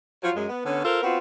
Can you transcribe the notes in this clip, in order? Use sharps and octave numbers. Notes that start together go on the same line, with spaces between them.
F3 F#3 F4 C#5
F#2 G#3
B3
D3 B3 C#4
F4 A4 A#4 C5
B3 C4 F4 F#4